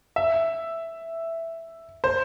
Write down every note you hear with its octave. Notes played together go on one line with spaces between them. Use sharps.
E5
C5